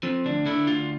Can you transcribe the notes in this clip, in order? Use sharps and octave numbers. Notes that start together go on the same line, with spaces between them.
F3 C4
D2 D4
D3 E4
D2 F4